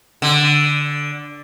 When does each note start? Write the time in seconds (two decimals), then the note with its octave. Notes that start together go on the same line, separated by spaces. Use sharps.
0.22 D3